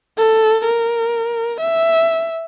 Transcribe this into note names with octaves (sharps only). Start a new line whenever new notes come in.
A4
A#4
E5